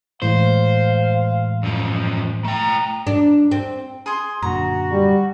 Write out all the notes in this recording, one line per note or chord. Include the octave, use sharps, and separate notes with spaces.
A2 E3 G#3 C5 F5
F#2 F3
A3 G5 A#5
D4
C4
G#4 C6
F#2 A#2 D3 F#4 A#5
G3